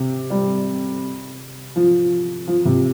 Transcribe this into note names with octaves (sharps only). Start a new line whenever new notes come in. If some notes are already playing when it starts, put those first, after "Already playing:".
Already playing: C3
G3
F3
F3
C3